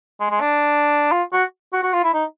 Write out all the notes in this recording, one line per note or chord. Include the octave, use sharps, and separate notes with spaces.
G#3
G#3
D4
F4
F#4
F#4
F#4
F4
E4
D#4